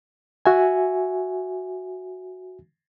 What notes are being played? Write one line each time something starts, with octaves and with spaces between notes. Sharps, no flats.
F#4 E5 G#5